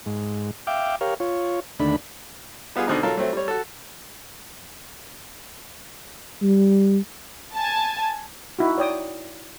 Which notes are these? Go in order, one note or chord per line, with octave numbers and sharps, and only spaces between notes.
G#2
E5 F5 G5 D6
G4 A#4 C#5 F5
F4 C#5
D#2 D3 A3 D4 B5
G3 B3 F4 G#4
B2 D3 C4 D#4
F#3 F4 A4 A#4
F#3 A3 C4
G3 C#5
F#4 A4
G3
G#5 A5
D#4 E4 F#4
C#5 D5 G5 D#6